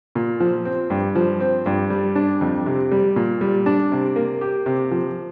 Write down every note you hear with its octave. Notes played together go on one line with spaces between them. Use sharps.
A#2
F3
C4
G2
F3
C4
G2
G3
D4
F2
C3
G3
A#2
G3
D4
C3
A#3
G4
C3
F3